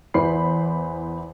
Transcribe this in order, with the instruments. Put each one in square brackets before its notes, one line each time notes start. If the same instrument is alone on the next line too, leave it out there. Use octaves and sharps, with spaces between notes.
[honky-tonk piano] E2 E3 C5 B5 C7